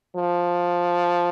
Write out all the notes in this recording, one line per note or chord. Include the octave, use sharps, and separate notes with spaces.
F3